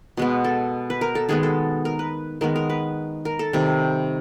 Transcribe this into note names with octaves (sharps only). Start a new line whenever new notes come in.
B2 G#3 B3
A4
B4
A#4
A4
D#3 G#3 B3 G#4
A4
A#4
B4
D#3 G#3 B3 A#4
A#4
B4
A#4
A4
C3 D#3 G3